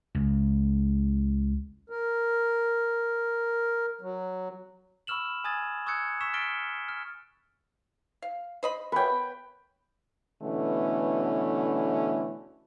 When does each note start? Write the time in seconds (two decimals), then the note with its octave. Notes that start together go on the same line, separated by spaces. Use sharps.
0.15 C#2
1.90 A#4
4.01 F#3
5.07 B5 C#6 E6 F6 E7 F#7
5.44 G#5 D#6 G#6 A6
5.86 C#6 D#6 E6 F#6 G#6 C#7
6.21 C#6 E6 B6 E7
6.33 F6 A6 B6 C#7 D7 G7
6.89 F6
8.22 F5
8.63 C5 D#5 B5
8.92 B3 B4 C#5 G5
10.43 B2 D3 E3 A3 C#4